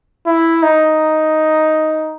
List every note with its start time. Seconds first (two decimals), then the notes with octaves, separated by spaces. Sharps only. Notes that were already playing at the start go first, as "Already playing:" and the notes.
0.27 E4
0.63 D#4